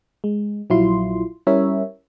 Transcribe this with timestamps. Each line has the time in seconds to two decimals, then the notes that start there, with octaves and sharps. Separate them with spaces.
0.24 G#3
0.70 A#1 F#3 E4 F4 C6
1.47 G3 C#4 E4 A#4 C#5 E5